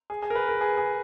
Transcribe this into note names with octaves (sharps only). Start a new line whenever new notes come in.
G#4
G#4
A#4
B4
A#4
G#4
G#4